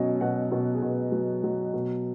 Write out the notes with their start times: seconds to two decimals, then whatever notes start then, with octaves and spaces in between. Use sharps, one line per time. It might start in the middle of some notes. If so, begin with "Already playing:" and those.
Already playing: B2 F#3 C#4 D#5
0.21 B2 F#5
0.52 B2
0.74 G#4
0.82 B2 B4
1.12 F#3
1.44 F#3
1.73 B2